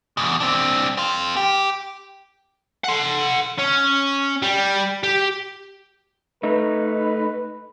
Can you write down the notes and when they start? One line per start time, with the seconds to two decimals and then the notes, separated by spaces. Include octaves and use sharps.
0.17 E2 B2
0.40 C4 D4
0.97 C4 F4
1.37 G4
2.84 F#5 C6
3.59 C#4
4.42 G3
5.04 G4
6.43 A3 D#4 B4